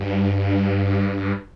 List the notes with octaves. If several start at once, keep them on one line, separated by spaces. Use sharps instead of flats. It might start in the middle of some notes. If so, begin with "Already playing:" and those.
Already playing: G2